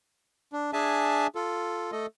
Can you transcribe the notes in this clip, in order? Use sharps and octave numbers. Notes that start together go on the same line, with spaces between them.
D4
D4 G#4 E5 G#5 A5
F4 A4
A3 A4 D#5